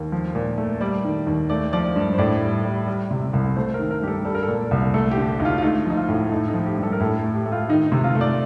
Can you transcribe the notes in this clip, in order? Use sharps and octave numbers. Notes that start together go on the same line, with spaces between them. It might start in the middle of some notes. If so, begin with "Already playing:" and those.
Already playing: D#2
F3
A#2
A3
G3 D5
D#3
D#2
A3 D5
F3 D5
G2
C5
A2 D5
G3
G3
G3
C3
C2
A3 C5
A#4
D#3
A#4
G2 G4
A4
G3 A4
A#4
A4
A#2
C2
A3 A4
G4
D3
G4
D2 D#4
F4
F4
A3 D#4
F3 D#4
F4
A2
A3 D#4
D#4
F3
G4
G2
A4
A#4
A2 A4
A3
G4
A3
F4
D#3 D#4
D#4
C3
F4
A3
D5